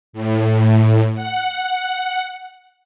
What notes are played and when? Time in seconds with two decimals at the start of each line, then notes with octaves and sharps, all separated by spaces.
0.13 A2
1.15 F#5